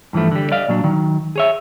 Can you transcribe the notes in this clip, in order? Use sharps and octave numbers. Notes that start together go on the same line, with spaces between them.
G2 E3 F3 A3
D3 G3
D5 D#5 F5
A#2 F#3 D4
D#3 F#3
G#4 C#5 E5